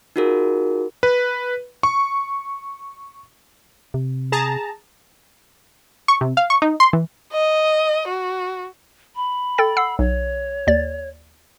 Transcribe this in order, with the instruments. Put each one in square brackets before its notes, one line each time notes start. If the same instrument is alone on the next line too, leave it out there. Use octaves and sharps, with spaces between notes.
[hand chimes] D#4 F4 F#4 G#4 A#4
[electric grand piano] B4
C#6
[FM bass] C3
[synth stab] G#4 A5 A#5
C#6
C3
F5
C#6
D#4
C6
E3
[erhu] D#5
F#4
[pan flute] B5
[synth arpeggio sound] A4 G5 A6
F#5 E6 C7
[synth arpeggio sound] B1 [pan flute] C#5
[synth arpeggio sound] D#2 D5 A6